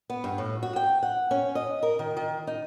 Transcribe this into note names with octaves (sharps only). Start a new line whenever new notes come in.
B3
G2
A2
F#4
G5
F#5
C#4
D#5
A#4
D#3
D#3
D#4